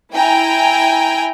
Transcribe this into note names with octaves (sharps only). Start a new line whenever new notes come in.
E4 G5 G#5 A#5